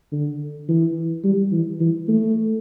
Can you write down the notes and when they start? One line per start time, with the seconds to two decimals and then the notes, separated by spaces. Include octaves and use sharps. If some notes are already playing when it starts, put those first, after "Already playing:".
0.12 D3
0.69 E3
1.25 G3
1.52 E3
1.81 E3
2.09 A3